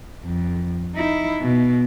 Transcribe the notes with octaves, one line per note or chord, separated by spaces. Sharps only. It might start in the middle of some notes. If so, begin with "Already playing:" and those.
F2
D#4 E4
B2